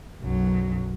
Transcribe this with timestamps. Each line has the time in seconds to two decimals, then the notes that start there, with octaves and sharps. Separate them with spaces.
0.22 B1 F#2 F#3